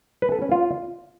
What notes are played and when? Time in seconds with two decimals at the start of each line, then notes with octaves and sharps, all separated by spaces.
0.22 B4
0.32 A4
0.42 C#4
0.52 F4